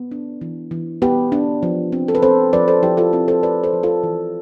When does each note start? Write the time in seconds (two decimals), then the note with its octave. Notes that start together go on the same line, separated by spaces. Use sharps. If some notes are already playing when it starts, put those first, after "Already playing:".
Already playing: B3
0.12 D4
0.41 E3
0.71 E3
1.02 B3 G4 B4
1.32 D4
1.63 F3
1.92 C4
2.08 A4
2.15 B4
2.22 C4 A4 C5
2.53 F3 B4 D5
2.68 A4 C5
2.83 F3 E4 G4
2.97 F4 A4
3.13 C4 E4
3.28 A4 C5
3.43 C4 B4 D5
3.63 A4 C5
3.73 F3
3.83 F4 A4
4.03 E3